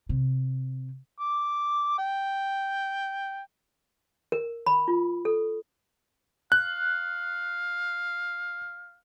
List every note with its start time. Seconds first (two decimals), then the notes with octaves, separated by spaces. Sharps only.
0.09 C3
1.19 D6
1.99 G5
4.32 A#4
4.66 B5
4.88 F4
5.25 A4
6.52 F5 F#6